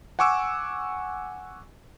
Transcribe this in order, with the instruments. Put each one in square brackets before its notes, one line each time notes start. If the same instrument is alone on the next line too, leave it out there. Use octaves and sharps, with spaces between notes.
[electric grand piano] F#5 G#5 C#6 D6 E6